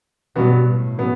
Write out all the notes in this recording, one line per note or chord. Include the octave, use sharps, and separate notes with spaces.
G2 B2 F#3 B3 F#4
A2
F#3 B3